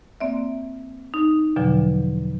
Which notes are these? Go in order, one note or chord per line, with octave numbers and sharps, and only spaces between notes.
A#3 C4 D5 E5
D#4
E2 B2 D3 F3 F#3